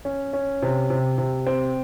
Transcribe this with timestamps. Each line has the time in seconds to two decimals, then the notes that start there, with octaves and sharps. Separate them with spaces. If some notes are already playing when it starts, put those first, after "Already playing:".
0.05 C#4
0.33 C#4
0.62 C3
0.90 C3
1.18 C3
1.47 C4